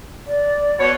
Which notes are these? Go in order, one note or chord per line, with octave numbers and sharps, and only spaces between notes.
D5
B2 C#5